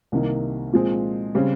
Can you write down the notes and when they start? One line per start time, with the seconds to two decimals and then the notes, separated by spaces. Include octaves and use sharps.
0.12 C2 C3 D#3 A#3 D#4
0.73 A#2 F3 G#3 C4
1.35 C#3 G3 C4